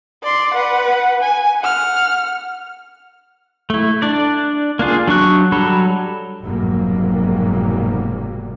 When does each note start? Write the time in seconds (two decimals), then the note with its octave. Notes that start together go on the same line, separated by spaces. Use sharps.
0.23 D5 C6
0.53 B4 F#5
1.21 G#5
1.61 F#5 F6
3.70 A3 E4
4.02 D4 D5
4.79 A#3 D4 F4 G#4
5.08 F#3 D4 C#6 F#6
5.52 F#3 G3 A4 B5
6.42 F1 G#2 B2 F#3 G3 A#3